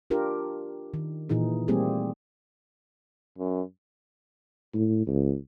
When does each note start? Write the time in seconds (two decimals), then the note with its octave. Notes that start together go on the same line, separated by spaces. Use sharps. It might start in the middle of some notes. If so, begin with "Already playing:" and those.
0.10 D4 F4 G4 A#4
0.94 D#3
1.29 A#2 E3 D#4 G#4
1.68 G3 A3 A#3 C4 G4 G#4
3.38 F#2
4.74 A2
5.07 C#2